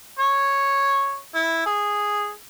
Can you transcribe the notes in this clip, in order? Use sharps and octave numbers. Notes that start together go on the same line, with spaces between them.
C#5
E4
G#4